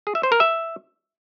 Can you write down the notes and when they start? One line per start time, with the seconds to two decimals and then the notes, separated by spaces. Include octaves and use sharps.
0.07 G#4
0.15 E5
0.23 C5
0.32 A#4
0.40 E5